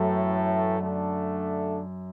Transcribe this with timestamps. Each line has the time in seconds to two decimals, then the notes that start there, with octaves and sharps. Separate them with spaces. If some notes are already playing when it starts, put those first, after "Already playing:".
Already playing: F#2 A2 E3 A3
0.78 D3 A3 D4